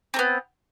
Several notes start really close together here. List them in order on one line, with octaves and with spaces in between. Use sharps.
C4 A3 B3